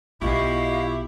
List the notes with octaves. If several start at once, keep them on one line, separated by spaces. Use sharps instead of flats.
B1 F#3 E4 F4 G4 D#5 F5 C#6